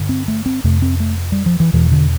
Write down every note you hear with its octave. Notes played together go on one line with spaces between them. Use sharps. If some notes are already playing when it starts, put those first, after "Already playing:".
Already playing: G2 D3
C4
A3
C4
F2 C3 A3
C4
A3
G3
F3
E3
E2 B2 E3
D3